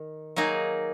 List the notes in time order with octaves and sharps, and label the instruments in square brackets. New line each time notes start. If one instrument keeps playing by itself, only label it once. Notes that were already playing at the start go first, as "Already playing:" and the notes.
Already playing: [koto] D#3
F#3 A#3 D#4 G#4